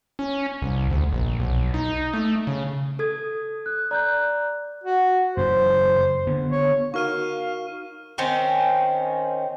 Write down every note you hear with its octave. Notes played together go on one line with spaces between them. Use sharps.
C#4
C2
D2
A#1
B1
D#4
A3
C#3
A4 D#6 G#6
F#6
D5 A#5 F#6 G6
F#4
F#2 C#3 E3 C5
D3 B3
C#5
D#4 F#4 A#4 F5 C#6 F6 D#7
D#3 C4 C#4